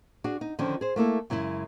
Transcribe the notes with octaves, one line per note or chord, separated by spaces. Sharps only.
D4 F#4 G#4
D#4
D3 D#3 F3 C#4
G#4 C5
A3 A#3 E4 A4
F#2 C#3 G#3 E4